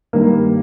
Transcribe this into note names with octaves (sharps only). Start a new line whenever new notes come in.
G2 D#3 A#3